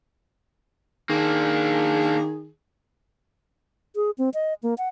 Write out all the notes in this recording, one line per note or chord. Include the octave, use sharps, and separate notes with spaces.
D#3 A#3 D4 G#4
G#4
C4
D#5
A#3
F#5